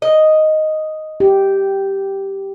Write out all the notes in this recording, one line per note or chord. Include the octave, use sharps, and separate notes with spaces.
D#5
G4